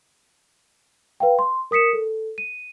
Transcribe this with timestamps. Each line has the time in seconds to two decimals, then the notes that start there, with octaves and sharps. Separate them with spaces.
1.20 B4 F5 G5
1.39 C6
1.71 A#4 D#6 B6 C#7 E7
1.93 A4
2.38 D#7